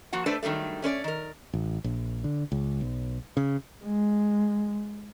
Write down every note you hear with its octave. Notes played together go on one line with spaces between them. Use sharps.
F3 A#3 F#4 F#5
A3 D4 A4 B4 C5 D5
G2 D#3 F#3 G3 A3
A3 C#4 B4 D5
D#3 A#4
A1
A#1
D3
C#2
B1
C#3
G#3